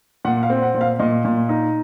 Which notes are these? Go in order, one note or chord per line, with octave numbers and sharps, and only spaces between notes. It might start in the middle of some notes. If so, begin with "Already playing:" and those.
A#2 F#5
F5
C4
F#5
A#2
F5
A#2 D#5
A#2
D#4